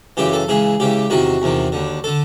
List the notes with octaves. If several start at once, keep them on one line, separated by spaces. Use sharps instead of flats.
F#2 C#3 E3 G4
A4
C#2 C#3 E3 G#4
C#2 C#3 E3 G4
E2 C3 D#3 F#4
E2 C3 D#3
D#2 D3
D3 A4